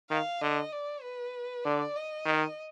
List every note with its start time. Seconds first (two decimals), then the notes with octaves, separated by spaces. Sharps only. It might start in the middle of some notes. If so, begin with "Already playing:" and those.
0.10 D#3 F5
0.41 D3 D#5
0.72 D5
1.03 B4
1.64 D3 D5
1.96 D#5
2.26 D#3